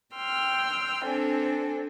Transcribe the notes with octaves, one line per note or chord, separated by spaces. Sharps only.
G5 C6 E6 F6
C4 D4 A4 G#5